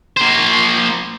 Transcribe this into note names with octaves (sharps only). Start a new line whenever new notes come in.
A#3 C5